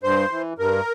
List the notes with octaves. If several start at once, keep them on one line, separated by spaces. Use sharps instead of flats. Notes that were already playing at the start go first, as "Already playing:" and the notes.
G2 C5
E3
G2 A#4